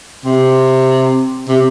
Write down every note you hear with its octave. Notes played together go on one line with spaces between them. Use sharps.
C3
C3